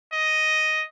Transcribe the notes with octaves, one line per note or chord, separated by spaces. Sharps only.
D#5